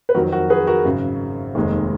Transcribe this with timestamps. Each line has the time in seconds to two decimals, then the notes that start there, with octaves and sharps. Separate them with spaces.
0.09 B4
0.14 F2 D#3 F#3 F#4 A#4
0.32 F#4 A#4
0.50 G#4 B4
0.67 F#4 A#4
0.84 G#1 F#2 C#3
1.55 F1 D#2 D#3 G#3